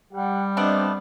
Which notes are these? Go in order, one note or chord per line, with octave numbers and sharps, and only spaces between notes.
G3 G4 F#5 G5
A3 B3 C4 D4 D5 D#5